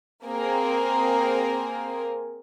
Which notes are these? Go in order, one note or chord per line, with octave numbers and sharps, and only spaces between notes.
A#3 C4 G#4 A#4